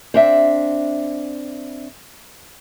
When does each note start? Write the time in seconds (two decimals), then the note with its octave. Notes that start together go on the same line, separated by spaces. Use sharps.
0.14 C4 D4 E5